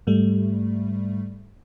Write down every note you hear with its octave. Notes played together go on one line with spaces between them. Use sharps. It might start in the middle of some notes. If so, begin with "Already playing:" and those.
G#2 G3 A3